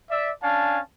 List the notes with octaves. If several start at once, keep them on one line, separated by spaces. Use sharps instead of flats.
D5 E5
C#4 D4 F5 G#5 A5